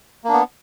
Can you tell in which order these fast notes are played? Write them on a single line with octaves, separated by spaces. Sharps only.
A#3 D4 B3